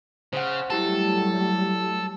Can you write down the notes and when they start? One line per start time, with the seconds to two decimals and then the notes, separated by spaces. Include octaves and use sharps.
0.33 C#3 C5 F#5
0.70 F#3 G3 A3 E4 G4 A4 A5